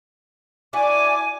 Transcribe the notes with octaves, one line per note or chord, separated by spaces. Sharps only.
D4 E4 F#4 G#5 D6